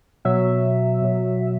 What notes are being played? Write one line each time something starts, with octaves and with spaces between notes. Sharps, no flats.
B2 F#3 E5
B2 F#3